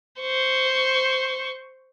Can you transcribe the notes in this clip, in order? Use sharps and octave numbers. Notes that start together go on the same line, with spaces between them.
C5 C#6